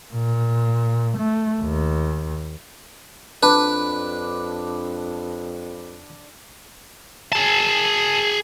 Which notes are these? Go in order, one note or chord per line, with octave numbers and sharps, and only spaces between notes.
A#2
A3
D#2
F2 D4 B4
G#4 A5